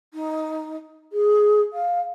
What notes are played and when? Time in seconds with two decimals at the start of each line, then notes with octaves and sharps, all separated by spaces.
0.13 D#4
1.12 G#4
1.73 F5